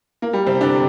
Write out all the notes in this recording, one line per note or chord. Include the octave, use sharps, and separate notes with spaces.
A#3
G3
C3 C4
D3 D4